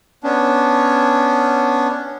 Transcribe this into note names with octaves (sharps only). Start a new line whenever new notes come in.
B3 C#4 D4